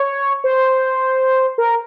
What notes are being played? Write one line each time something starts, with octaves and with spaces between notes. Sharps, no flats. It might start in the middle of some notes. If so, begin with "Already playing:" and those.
Already playing: C#5
C5
A#4